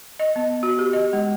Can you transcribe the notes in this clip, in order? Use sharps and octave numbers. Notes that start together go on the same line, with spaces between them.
D#5
B3
F#4
G4
D#5
G#3